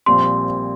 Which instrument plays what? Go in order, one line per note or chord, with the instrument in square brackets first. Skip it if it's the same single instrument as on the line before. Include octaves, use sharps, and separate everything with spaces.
[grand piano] A#1 A#2 G3 C4 [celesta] C6